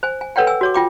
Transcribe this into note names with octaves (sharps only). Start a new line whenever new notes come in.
C5 G#5
G#5
A4 B4 C#5 F#5 G5
G#5 E6
F#4 C#5 D6
F4 G5 D6